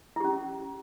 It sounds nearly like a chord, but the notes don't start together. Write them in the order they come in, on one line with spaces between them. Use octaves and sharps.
E4 G4 C#4